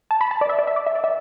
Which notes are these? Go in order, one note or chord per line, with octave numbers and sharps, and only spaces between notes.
A5
B5
A5
D5
E5
D5
E5
D5
E5
D5
E5